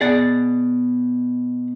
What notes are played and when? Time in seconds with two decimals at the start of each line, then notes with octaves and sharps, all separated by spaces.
0.01 B2 G#4 D5 F#5